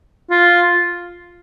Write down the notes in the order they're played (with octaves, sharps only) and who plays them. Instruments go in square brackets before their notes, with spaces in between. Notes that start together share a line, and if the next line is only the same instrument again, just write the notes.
[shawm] F4